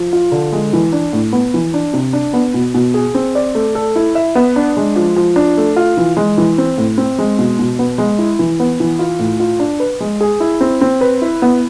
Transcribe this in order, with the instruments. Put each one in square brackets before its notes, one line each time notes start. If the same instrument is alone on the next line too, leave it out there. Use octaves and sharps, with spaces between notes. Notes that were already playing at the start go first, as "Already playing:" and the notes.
Already playing: [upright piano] F3
F4
D3
G#3
E3
D4
A2
B3
E3
D4
C3
D4
B3
B2
B2
G#4
C4
D5
A3
A4
E4
E5
B3
D4
G#3
F3
F3
D4
A3
F4
E3
G#3
E3
C4
A2
C4
G#3
B2
B2
B3
G#3
E4
E3
B3
E3
F4
A2
F4
D4
B4
G#3
G#4
E4
C4
C4
B4
E4
B3